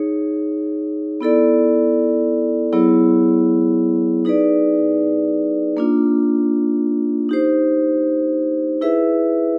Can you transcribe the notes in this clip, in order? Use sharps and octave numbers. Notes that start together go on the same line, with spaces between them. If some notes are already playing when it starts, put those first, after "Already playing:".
Already playing: D#4 G#4 C#5
B3 E4 A4 D5
F#3 B3 E4 G#4 C#5
D#4 G#4 B4 D5
A#3 D4 F4
D#4 G4 C5
E4 G#4 B4 E5